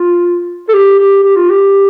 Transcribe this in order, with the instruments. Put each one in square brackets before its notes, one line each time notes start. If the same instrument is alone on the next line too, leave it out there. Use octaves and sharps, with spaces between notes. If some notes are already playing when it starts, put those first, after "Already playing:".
Already playing: [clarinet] F4
A4
G4
G4
G4
F4
G4